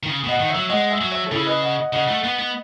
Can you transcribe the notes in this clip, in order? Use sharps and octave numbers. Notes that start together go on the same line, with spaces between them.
D#3
C#3
B2 D#5 F#5
D#3
C#5 E5
F#3
G#3 D#5 F#5
E5 G#5
F#3
C#5 E5
A4
C#3 E4 G#4
B4 D#5
D#5 F#5
D#5 F#5
C#3 D#5 F#5
A3
B3
B3